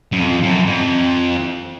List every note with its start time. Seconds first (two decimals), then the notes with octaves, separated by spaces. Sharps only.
0.12 F#2
0.20 F2
0.43 F#2
0.67 F2